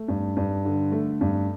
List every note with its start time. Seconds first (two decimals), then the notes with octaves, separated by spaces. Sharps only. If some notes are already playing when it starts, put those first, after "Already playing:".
Already playing: A3
0.08 G2
0.37 G2
0.65 D3
0.92 A3
1.21 G2